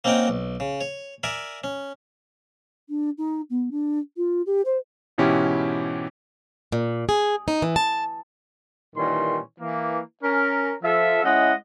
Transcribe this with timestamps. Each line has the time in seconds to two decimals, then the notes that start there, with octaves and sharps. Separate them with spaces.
0.04 A#3 C4 C#4 D#4 F#5 G5
0.28 B1
0.60 C#3
0.81 C#5
1.23 A#4 D5 E5 G#5
1.64 C#4
2.89 D4
3.18 D#4
3.50 B3
3.71 D4
4.17 F4
4.46 G4
4.65 C5
5.18 G#2 B2 E3 C#4 E4 G4
6.72 A#2
7.09 G#4
7.48 D#4
7.62 E3
7.76 A5
8.96 A#2 D#3 E3 G3 C#4 C6
9.60 E3 A#3
10.23 C#4 A#4
10.83 F3 A4 E5
11.24 G#3 C#4 E4 D#5 F#5